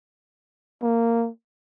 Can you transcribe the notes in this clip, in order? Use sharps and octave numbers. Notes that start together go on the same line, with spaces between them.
A#3